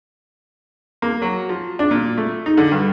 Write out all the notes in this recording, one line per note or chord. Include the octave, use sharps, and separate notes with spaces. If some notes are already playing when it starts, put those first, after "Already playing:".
A#3
F#3
F3
D4
A#2
A3
D#4
D3
G2